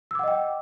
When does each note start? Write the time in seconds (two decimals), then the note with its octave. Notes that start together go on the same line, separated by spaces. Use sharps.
0.11 E6
0.15 D6
0.19 F#5
0.24 D#5
0.28 G5